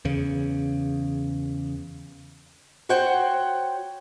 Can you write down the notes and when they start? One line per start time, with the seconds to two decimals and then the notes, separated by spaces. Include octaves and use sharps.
0.05 E2 C#3
2.89 F#4 C5 C#5 F#5 G5